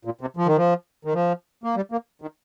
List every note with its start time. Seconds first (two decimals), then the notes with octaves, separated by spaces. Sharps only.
0.05 A#2
0.21 C3
0.37 F3
0.46 D#3
0.57 F3
1.05 D#3
1.14 F3
1.64 A#3
1.76 G3
1.92 A#3
2.22 D#3